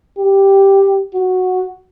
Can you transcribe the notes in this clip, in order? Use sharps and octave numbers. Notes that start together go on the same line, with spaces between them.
G4
F#4